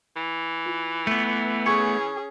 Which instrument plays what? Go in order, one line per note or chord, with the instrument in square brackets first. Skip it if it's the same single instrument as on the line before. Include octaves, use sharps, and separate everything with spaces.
[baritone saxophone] E3
[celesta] F4
[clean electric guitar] A3 B3
[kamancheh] C#4 G#4 [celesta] C#6 G#6 C#7